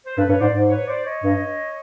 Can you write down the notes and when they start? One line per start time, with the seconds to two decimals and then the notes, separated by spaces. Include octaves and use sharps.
0.06 C5
0.16 G2 A4 B4
0.29 G2 B4 C#5
0.41 G#2 C5 D5
0.53 G#2
0.70 B4 C#5
0.88 C5 D5
1.05 C#5 D#5
1.23 G2